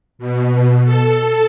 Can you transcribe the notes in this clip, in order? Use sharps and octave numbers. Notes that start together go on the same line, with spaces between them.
B2
A4